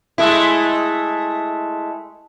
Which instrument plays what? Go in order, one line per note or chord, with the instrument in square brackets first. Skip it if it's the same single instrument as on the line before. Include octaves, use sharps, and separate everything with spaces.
[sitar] G#3 A3 E4